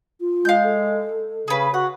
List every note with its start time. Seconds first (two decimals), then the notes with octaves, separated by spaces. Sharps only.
0.20 F4
0.45 G#3 F5 G6
0.64 A4
1.48 C#3 G#4 B4
1.74 F#4 F#5